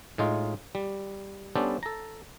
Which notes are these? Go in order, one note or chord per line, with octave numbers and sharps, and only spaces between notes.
A2 G#3 D#4 F4
G3
G3 B3 C#4 D4 A4 C5
A4 A#5